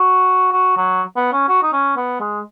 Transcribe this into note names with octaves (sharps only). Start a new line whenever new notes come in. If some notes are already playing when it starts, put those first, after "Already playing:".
Already playing: F#4
F#4
F#3
B3
C#4
F#4
D#4
C#4
B3
G#3